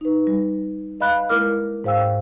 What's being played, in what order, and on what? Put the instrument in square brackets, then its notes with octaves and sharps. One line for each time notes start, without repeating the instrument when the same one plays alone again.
[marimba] D#4 B4
G3
B4 D#5 F5 B5 F#6
G#3 A#3 E4 A#4 D6 F6
G#2 C5 F5 G5 E6